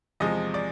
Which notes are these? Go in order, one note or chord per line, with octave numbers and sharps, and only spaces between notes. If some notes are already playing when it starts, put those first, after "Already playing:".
E2 C3 F3 G#3 D#5
D5